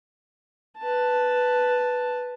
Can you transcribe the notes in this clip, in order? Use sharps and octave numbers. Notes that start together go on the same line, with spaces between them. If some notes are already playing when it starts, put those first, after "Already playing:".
B4 A5